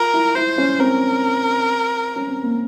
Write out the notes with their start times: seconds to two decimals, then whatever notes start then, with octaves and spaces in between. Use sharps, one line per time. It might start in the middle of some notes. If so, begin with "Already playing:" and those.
Already playing: F4 A#4
0.14 E4
0.36 E4 C5
0.58 C#4
0.79 C4 A#4
2.16 C#4
2.29 C4
2.43 A#3